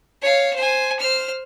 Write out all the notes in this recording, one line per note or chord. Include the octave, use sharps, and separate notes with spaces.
C#5 F5
C5 G#5
C5 F6